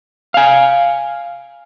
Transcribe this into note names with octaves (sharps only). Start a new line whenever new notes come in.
F5 G#5